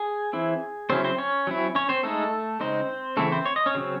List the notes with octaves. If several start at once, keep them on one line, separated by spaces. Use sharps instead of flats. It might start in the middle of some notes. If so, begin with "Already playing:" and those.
Already playing: G#4 G#5
E3 C4 E4
C#3 F#3 C4 C#4 E4 C5
C4 C5
C#4 C#5
F#3 C4 E4
C#4 C#5
C4 C5
G#3 A3 D#4 A4
C#3 G#3 C4 D#4 C5
C#3 E3 A3 C4 E4 A4
C4 C5
C#5
D#5
C#4 C#5
C#3 F#3 C4